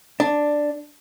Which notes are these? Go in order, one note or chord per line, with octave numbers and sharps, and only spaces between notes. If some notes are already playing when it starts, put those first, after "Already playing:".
D4